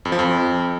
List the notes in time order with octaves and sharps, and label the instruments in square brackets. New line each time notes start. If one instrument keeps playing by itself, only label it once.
[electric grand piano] F2
F3
F2